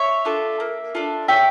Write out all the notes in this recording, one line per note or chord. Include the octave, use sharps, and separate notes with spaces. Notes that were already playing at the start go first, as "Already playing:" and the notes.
Already playing: C#5 E5
D4 F4 A4
A#3
D4 F4 A4
C#4 E5 G5